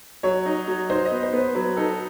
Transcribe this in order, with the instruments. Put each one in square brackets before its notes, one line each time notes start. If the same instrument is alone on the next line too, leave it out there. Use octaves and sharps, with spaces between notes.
[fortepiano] F#3 [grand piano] C#5
[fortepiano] D#4
F#3
[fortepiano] D#4 [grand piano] C5
[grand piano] D#5
[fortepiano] B3
[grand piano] C5
[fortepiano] B3
[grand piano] C5
[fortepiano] F#3 [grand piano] B4
[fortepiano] D#4 [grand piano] A4